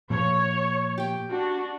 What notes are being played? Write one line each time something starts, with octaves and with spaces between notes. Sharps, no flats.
A#2 F3 C#5
G4 G5
D4 F#4